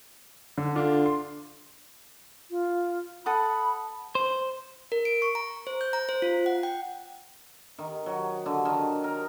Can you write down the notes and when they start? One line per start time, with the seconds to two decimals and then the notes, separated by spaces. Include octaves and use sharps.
0.58 D3
0.75 D3 D4 F4
1.06 C6
2.51 F4
3.26 A4 F#5 B5 D#6
4.15 C5
4.92 A#4
5.05 D7
5.22 C#6
5.35 A#5
5.67 C5
5.81 G6
5.93 A#5
6.09 C5
6.22 F4
6.46 F#5
6.63 G5
7.78 D#3
8.06 F#3
8.46 D3
8.65 D#3
9.04 A#4